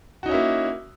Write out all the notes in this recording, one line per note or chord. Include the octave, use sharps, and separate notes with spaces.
A#3 C#4 D#4 E4 F#4